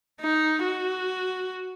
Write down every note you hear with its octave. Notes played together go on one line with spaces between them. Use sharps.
D#4
F#4